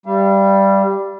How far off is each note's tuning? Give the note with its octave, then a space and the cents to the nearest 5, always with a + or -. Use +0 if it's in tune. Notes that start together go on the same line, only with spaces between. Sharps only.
G3 +0 F5 -40